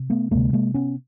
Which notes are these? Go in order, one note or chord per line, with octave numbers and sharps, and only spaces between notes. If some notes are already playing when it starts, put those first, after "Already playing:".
Already playing: C3
A3 B3
D2 C3 G#3 A#3
G#3 A#3
B3 C#4